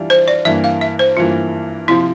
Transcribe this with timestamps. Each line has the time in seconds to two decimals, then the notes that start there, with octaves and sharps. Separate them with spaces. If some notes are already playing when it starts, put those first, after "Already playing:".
Already playing: E3 G3 D4 F4
0.10 C5
0.28 D5
0.45 G2 E3 A#3 E5
0.64 F5
0.81 E5
0.99 C5
1.17 G2 E3 A#3 F4
1.88 C3 F3 C4 E4 F4